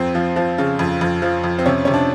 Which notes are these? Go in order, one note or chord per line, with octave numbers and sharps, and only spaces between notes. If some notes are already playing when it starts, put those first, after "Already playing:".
Already playing: F2 C4
F3
F3
C#3
F2
F2
F3
F2
C4
C3 C#4
C3 C#4
D4